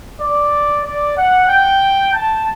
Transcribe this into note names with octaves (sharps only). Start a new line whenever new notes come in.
D5
D5
F#5
G5
A5